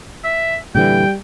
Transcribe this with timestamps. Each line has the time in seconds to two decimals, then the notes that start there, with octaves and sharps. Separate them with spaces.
0.24 E5
0.75 A#2 D3 E3 G3 G5